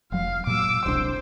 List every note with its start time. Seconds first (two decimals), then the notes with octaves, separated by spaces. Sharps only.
0.12 F1 F#3 F5
0.47 A#2 F#3 D6 E6
0.86 E1 C2 D4 C5